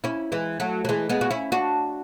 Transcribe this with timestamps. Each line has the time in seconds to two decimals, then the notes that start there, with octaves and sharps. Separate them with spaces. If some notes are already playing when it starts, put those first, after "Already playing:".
0.04 C#4 E4
0.32 E3 G#3
0.60 F#3 A3
0.85 F#3
0.89 E3 G#3
1.09 G#3 B3
1.21 F#4
1.31 C#4 E4
1.52 D4 F#4